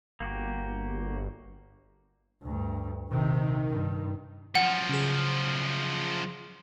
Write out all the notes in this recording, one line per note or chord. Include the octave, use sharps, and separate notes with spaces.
G1 A#3 F#4 G4
D2 G2
A#1 C3 D#3
G2
F#2 F3 F#5
C#3 G#4